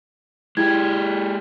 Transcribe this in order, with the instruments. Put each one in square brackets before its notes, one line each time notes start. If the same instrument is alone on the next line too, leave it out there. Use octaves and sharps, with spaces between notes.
[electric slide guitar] G#3 G4 [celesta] E4 G#6